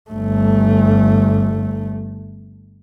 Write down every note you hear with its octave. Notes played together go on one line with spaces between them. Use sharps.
G1 A3